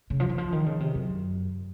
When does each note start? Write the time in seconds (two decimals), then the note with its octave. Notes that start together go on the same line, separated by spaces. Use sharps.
0.10 C#3
0.20 F3
0.29 D#3
0.38 F3
0.52 D#3
0.66 C#3
0.80 C3
0.95 F#2